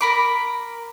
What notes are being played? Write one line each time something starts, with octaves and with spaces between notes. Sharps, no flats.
A#4 B5 D6